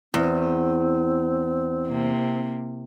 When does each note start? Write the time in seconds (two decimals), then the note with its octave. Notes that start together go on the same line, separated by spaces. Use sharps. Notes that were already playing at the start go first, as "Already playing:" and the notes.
0.14 E2 C4
1.87 C3 A#3